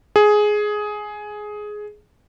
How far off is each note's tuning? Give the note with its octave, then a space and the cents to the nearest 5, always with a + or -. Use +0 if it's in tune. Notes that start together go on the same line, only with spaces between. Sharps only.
G#4 +10